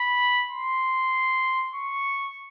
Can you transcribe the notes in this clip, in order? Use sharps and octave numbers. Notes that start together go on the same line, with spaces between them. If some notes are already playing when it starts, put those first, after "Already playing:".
Already playing: B5
C6
C#6